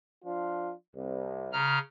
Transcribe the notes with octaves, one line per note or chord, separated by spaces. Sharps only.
F3 D4 F4
C2
C#3 A#5 F6